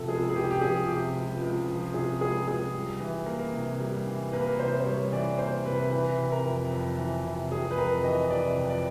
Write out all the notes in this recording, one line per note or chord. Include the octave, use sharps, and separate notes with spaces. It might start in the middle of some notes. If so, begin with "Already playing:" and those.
Already playing: C3 F3 A4
C#2 G#4
G#4
C#2 G4
G4
F3 G#4
C3 G4
C#2
C#2
F3
C3 G#4
C#2 G#4
C#2 G#4
G3
E3
A#3
C3
G3
E3
A#3 B4
C3 C5
C5
G3 C#5
E3 D5
A#3 C5
C3 B4
E3 B4
C3
A#4
F2
F2
E3
C3
F2 G#4
B4
F2 A#4
E3 D#5
C3 D5
F2
D5